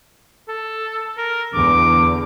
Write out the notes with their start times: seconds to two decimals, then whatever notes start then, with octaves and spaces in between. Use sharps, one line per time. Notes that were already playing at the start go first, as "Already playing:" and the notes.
0.48 A4
1.17 A#4
1.54 E2 D3 D6